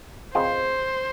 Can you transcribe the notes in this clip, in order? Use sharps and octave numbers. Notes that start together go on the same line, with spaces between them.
C#2 C#3 G#3 C4 F4 C5